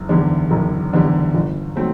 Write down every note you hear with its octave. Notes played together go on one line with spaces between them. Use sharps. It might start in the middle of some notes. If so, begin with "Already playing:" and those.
Already playing: F#1
E2 D3 G3
F#1
E2 D3 G3
G1
F#3 A3 C4